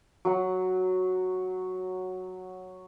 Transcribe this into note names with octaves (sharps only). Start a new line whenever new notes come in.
F#3 F#5